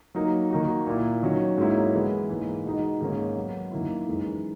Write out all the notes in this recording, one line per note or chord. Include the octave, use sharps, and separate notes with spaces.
F#3 A#3 D#4 A#4
D#3 A#3 D#4 F#4
A#2 A#3 E4
D#3 F#3 C#4
G#2 F#3 A#3 C#4 E4
E3 G#3 B3
G#2 E3 A#3
B2 G#3 D#4
G#2 D#3 A#3 C#4
F#3 B3 F#4
F#2 D#3 A#3 E4
F#2 E3 G#3 D#4 A#4